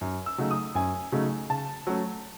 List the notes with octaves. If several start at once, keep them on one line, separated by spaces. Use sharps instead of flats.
F#2
E6
C#3 F#3 A3 D#4
D#6
F#2 G#5
C#3 F#3 A3 D#4
C#3 A5
F#3 A3 C#4